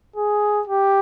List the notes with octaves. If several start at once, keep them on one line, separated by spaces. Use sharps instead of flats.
G#4
G4